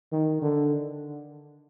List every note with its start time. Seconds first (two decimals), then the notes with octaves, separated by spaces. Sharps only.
0.12 D#3
0.42 D3